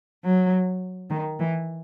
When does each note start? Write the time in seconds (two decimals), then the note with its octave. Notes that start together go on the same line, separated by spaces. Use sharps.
0.24 F#3
1.10 D#3
1.40 E3